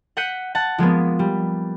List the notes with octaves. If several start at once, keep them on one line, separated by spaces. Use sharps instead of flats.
F#5 F#6 G6 B6 C#7 D#7
F#5 A5
F3 G#3 A#3 B3
G3